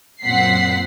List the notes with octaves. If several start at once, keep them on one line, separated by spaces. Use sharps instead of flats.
F#2 A#2 C4 F#5 B6 C7